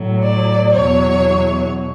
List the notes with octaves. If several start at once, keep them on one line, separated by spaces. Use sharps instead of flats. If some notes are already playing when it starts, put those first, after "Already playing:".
Already playing: A2 F#3
D5
E2 B2 F#3 C#5